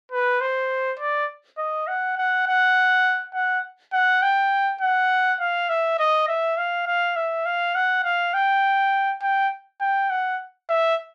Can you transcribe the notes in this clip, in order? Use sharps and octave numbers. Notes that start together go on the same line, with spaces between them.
B4
C5
D5
D#5
F#5
F#5
F#5
F#5
F#5
G5
F#5
F5
E5
D#5
E5
F5
F5
E5
F5
F#5
F5
G5
G5
G5
F#5
E5